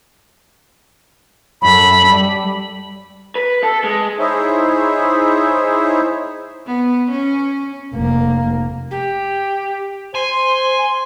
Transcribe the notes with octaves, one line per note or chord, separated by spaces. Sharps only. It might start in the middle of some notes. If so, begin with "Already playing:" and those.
F#2 A4 B5
G3
B4
A4
G#3
D#4 E4 G#4 C5 C#5 E5
B3
C#4
F1 A#3
G4
C5 G#5 C6